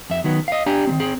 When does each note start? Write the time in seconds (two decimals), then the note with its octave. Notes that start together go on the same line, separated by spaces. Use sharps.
0.10 F2 E5
0.24 D#3 F#3 B3
0.48 D#5 F5
0.66 D4 G4 D5 G#5 A#5
0.87 D#3 A3 C4
1.00 C4 G#4